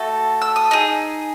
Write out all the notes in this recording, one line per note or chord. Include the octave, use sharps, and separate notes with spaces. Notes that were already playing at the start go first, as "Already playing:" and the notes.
Already playing: A3 F#4 A4
E6
D#6
D#4 G#4